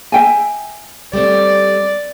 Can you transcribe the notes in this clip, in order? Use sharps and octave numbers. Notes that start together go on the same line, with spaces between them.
E5 G5 G#5
G3 A3 C4 D5